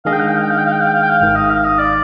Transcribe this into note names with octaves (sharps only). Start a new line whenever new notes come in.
D#3 G#3 D4 G#4 D#5 F5
G5
F5
G5
F5
G5
F5
G5
F5
G5
F5
G5
F5
G5
F5
G#1 G#2 D#3 F5
D#5
F5
D#5
D5